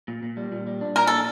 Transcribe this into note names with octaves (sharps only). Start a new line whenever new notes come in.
A#2
A#2
G3
A#2
G3
D4
A#2 A#4
D4 A4